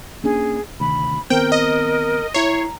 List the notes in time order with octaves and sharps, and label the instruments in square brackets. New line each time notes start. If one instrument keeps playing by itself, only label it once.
[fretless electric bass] A#3 C#4 D4 [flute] G#4
[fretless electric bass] D2 C3 D#3 [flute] B5
[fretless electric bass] D#3 B3 [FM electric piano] C4 [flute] A#4 [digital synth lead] G5
[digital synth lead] D#5
[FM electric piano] E4 C7 [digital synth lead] C#5 [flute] A#5